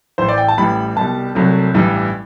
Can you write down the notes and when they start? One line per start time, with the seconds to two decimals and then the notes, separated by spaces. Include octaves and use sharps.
0.18 A1 A2 E3 C5
0.28 D5
0.38 G5
0.48 A5
0.57 A1 A2 E3 G3 B5
0.96 C2 B2 G3 A5
1.35 C2 C3 F#3 A3
1.74 A1 G2 E3 G3